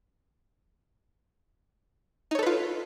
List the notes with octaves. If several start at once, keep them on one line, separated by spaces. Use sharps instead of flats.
D#4 F4 A4 B4 C#5